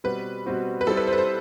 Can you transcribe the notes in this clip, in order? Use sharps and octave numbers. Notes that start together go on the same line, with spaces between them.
B2 G3 C4 F#4 B4
B2 G3 C4 F#4
B4
G3 C4 E4 A4
B4
C5
B4
C5